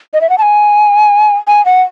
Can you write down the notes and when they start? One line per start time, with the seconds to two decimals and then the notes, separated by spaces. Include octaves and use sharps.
0.14 D#5
0.21 E5
0.30 F#5
0.38 A5
0.42 G#5
1.47 G#5
1.66 F#5